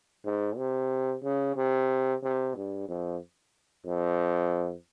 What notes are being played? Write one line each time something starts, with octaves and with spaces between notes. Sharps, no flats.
G#2
C3
C#3
C3
C3
G2
F2
F2